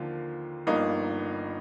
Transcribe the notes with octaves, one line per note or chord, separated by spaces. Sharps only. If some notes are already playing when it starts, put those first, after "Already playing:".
Already playing: D#2 D3 F3 A#3 F4
G1 G2 F3 A#3 D#4